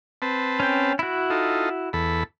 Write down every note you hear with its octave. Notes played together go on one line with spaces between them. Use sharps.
C4 B4 A5
C#4 G5
E4 F#4
D#4 F4 A4
E2 A4 B5